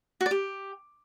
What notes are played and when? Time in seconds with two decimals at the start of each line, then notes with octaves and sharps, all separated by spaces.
0.21 F#4
0.26 D5
0.31 G4